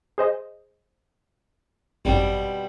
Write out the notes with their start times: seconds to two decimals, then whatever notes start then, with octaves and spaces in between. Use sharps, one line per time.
0.18 G#4 C5 D#5
2.05 G#1 F#2 B2 G3 C4